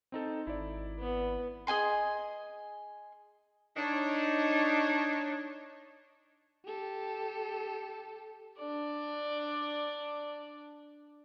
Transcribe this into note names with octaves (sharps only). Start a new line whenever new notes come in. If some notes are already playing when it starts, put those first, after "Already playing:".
C4 D#4 A4
G#1 E4 D5
B3
G#4 D#5 G#5 C6
D4 D#4 C#5
G4 A4
D4 D5